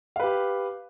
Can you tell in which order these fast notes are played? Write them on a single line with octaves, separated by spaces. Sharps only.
F5 B4 G4